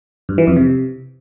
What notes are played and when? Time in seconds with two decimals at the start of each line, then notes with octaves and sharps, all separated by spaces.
0.29 G2
0.38 E3
0.47 F2
0.56 C3